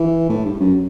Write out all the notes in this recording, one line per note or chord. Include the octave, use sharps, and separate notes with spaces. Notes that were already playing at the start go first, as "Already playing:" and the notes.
Already playing: E3
A2
G2
F#2